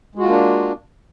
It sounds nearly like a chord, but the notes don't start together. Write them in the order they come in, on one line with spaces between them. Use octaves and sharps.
G#3 F#4 F4 A#3 D4